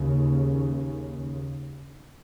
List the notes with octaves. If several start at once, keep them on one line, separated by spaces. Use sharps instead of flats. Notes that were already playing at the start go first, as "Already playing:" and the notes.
Already playing: D#2 C#3